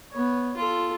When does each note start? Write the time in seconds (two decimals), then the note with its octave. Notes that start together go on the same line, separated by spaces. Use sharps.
0.12 B3 C#5
0.57 F4 A4